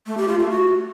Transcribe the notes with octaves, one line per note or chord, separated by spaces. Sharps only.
A3
G4
F4
A3
F#4